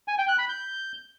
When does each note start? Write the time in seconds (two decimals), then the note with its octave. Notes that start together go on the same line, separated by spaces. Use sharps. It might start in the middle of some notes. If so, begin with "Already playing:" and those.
0.08 G#5
0.18 G5
0.28 F#6
0.39 B5
0.49 G6